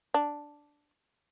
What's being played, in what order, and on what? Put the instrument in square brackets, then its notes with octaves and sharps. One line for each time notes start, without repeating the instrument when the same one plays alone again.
[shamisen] D4